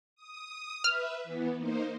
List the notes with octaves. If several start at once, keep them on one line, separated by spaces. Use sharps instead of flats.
D#6
B4 E5 F6
E3 B3
A#3 D#4 C5